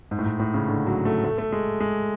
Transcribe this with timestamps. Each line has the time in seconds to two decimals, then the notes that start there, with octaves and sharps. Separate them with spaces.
0.11 G#2
0.19 A2
0.26 G#2
0.40 A2
0.54 C#3
0.68 D3
0.86 F#3
1.05 A3
1.24 A3
1.38 A3
1.52 G#3
1.80 G#3